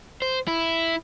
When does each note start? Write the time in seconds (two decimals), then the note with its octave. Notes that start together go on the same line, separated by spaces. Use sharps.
0.22 C5
0.48 E4